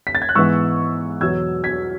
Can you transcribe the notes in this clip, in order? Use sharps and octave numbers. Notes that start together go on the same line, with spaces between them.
B6
A6
G#6
F#6
G#2 E3 B3 C#6 E6
E2 B2 F#3 E6 G#6
G#6 B6